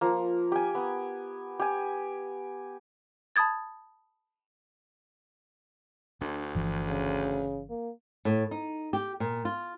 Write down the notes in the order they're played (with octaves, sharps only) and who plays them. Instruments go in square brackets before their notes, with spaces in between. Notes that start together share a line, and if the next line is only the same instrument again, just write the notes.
[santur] F3 A#3
G4 G#5
B3
G4 G#5
[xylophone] A5 B5 D#6 G#6 A6
[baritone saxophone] D2 [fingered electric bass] D4
[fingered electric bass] G1 E3 F3
[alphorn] C#3
A#3
[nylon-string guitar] A2
D#4
G4
A#2
F4